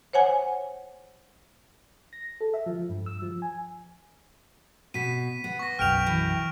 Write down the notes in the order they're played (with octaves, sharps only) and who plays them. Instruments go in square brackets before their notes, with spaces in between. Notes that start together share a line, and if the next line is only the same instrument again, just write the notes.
[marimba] C5 C#5 F#5 G#5
[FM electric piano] A#6
A4
E5
F3
G2
E6
F3
G#5
[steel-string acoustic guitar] B2 [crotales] B6 D#7
[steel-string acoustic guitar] B3
[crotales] C#6 A#6
[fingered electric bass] B1 F#2 [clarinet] G5 [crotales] F6 D7 F7
[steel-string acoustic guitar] E3